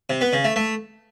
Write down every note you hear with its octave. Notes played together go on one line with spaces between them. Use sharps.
C3
B3
C#3
A3
A3